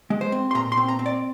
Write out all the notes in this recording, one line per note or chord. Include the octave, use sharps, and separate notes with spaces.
G#3
C5
C4
C6
A#2 A#5
C6
C4
A#5
C4
D5